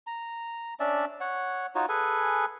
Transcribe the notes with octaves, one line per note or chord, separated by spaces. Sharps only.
A#5
C#4 D4 D5 E5
C#5 F#5
D#4 F4 F#4 C#5
G#4 A4 B4 G#5